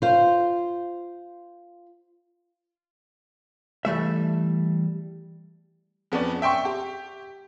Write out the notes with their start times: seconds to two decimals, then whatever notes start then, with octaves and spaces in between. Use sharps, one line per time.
0.02 F4 C5
3.85 E3 G3 A3 E5
6.12 F2 B3 C#4 D5
6.42 E5 G5 C6 C#6
6.65 G4